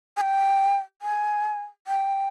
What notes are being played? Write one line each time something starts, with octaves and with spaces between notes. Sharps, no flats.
G#5
G5
G#5
G5